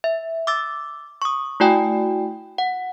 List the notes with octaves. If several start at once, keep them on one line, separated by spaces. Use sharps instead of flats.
E5
D6 E6 A6
C#6 D#6
A3 E4 F#4 D5 G5 G#5
F#5